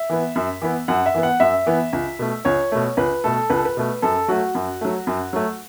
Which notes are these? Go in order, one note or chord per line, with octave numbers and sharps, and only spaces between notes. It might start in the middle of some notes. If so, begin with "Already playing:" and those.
Already playing: E5
E3 B3
F#2
E3 B3
F#2 F#5
E5
E3 B3
F#5
F#2 E5
E3 B3
C#2
B2 A3
C#2 C#5
B2 A3
C#2 B4
B2 A3 A4
C#2 B4
A4
B4
B2 A3
F#2 A4
F#3 A3 F#4
F#2
F#3 A3
F#2
F#3 A3